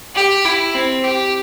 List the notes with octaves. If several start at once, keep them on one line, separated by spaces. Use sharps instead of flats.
G4
E4
C4
G4